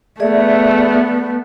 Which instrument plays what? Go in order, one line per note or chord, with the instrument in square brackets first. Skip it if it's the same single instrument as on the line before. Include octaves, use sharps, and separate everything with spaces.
[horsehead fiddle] A3 B3 [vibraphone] G#4 D5 E5